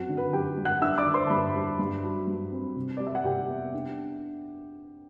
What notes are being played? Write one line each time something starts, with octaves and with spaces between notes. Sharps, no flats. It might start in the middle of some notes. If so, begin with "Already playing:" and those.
Already playing: F#2 C4 F#4 F#5
D3
B4
F#2 G4 G5
G3
F#5 F#6
D4 E5 E6
D5 D6
D3
C5 C6
A5
G2 B4 B5
G3
G2
F#3
G2
C4
C3
G3 D5
E5
F#5
C3 G4 G5
B3
D4